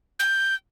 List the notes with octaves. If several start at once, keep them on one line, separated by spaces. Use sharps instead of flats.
G6